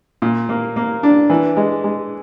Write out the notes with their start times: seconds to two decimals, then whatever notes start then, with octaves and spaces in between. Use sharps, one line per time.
0.22 A#2
0.49 A#3
0.76 A#3
1.03 D4
1.30 E3
1.57 G#3
1.84 G#3